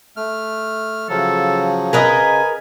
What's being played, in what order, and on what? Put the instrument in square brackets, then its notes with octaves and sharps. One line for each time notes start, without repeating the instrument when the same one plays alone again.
[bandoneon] A3 F6
[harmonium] C#3 [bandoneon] F3 F#3 [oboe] A4
[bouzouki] A#4 B4 D#5 [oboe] G#5